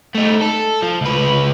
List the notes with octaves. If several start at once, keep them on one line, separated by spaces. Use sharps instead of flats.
A3 D#4
A4
F3
C#2 B4